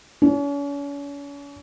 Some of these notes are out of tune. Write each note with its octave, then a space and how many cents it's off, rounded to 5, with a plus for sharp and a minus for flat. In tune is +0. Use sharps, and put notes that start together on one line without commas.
C#4 +40